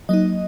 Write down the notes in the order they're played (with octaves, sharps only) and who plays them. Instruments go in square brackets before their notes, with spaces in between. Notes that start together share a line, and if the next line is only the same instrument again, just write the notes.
[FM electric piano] F#3 A#3 D#4 D#5